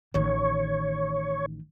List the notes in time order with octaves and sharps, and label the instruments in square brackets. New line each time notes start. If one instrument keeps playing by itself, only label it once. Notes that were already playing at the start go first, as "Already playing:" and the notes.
[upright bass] A1 D#3 [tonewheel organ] C#5